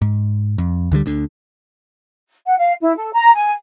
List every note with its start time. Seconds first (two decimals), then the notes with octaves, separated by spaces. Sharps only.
0.02 G#2
0.58 F2
0.91 D2 D3 D#3 G3
1.06 D2 D3
2.46 F#5
2.58 F5
2.81 E4
2.97 A4
3.14 A#5
3.36 G#5